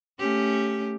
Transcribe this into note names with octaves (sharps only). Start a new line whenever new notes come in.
A3 C#4 G4